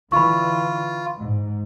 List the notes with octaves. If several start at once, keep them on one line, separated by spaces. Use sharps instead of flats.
D3 E3 F4 B5 C#6
G#2